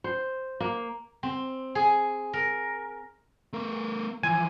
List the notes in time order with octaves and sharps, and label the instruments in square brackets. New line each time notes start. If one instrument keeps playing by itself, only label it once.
[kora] C5
A#3
[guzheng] C4
G#4
A#4
[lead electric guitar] A3 A#4
[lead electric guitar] E3 F3 [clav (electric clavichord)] G#5